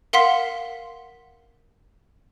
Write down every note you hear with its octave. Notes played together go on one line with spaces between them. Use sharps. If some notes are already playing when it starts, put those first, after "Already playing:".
A#4 F5 F#5 C6 B6